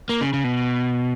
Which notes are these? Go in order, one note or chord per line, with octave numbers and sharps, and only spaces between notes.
A#3
C#3
C#3
B2